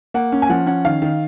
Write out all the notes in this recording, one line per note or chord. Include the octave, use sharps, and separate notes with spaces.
A#3 F#5
C#4
G#5
F3 F#5
C#4 F#5
D#3 F5
D#3